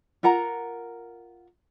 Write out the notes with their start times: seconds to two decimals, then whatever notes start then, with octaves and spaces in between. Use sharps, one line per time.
0.23 F4 A#4 F#5 A#5